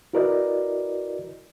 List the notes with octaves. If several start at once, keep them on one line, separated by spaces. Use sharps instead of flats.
E4 F#4 A#4 B4 D5 D#5